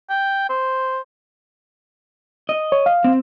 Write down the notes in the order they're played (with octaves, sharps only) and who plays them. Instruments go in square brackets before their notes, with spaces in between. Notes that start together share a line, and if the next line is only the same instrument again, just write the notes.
[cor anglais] G5
C5
[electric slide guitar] D#5
[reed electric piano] C#5
F5
[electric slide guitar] C4